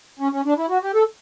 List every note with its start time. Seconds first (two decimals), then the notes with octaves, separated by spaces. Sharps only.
0.20 C#4
0.33 C#4
0.45 D4
0.57 E4
0.69 F#4
0.83 G4
0.95 A4